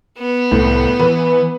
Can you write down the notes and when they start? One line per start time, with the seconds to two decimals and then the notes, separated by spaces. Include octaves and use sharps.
0.18 B3
0.52 C2 A2
1.00 E3 B4